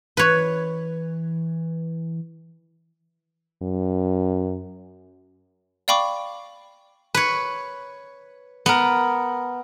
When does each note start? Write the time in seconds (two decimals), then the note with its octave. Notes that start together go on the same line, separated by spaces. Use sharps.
0.17 E3 B4 C#5
3.62 F#2
5.88 D5 F5 G5 B5 C#6 D6
7.15 B4 C#5
8.66 B3 A#4